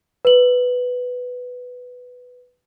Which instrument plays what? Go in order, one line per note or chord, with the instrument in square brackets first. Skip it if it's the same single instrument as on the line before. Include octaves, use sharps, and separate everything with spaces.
[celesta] B4 F#7